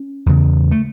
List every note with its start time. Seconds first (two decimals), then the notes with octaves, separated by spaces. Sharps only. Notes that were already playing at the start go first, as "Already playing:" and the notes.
Already playing: C#4
0.26 E2 C#3
0.71 A3